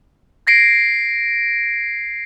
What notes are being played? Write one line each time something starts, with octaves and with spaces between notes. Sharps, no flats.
G#6 A#6 C7 D7